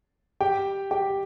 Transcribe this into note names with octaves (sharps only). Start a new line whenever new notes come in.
G4 G5
G4 G5